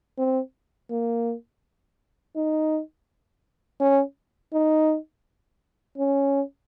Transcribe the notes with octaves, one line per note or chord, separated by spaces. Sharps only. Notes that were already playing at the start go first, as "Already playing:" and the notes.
C4
A#3
D#4
C#4
D#4
C#4